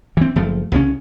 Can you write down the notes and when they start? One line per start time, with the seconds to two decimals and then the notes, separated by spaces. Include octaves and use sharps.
0.17 E3 C4
0.36 F#1 F3 A3
0.72 C2 C#3 G#3 C#4